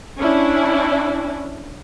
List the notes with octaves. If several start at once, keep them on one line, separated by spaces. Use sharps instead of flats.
C#4 D4 E4